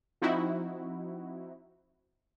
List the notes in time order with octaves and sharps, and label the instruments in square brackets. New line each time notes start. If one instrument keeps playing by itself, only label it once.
[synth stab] F3 C4 D#4 E4 F#4